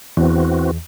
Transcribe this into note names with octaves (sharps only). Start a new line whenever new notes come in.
E2 E3 C4 F#4